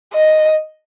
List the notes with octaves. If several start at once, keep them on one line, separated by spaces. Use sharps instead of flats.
D#5